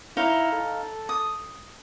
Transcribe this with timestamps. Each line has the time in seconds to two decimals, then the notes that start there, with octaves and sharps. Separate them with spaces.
0.17 D#4 E4 C#5 F5
0.53 A4
1.09 D#6